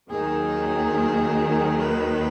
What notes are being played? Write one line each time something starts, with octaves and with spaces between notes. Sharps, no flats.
D#2 D#3 F#3 G#4
B4